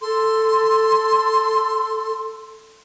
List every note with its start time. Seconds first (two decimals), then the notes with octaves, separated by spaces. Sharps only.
0.02 A4 C6